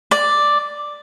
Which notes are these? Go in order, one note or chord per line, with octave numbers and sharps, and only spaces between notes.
D5